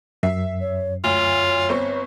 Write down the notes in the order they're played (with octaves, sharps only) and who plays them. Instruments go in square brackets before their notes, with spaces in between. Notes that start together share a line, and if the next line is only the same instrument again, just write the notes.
[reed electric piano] F#2 [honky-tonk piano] E5 C7
[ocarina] C#5
[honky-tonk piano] D2 [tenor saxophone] F4 [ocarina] C#5
[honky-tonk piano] G1 C4 C#6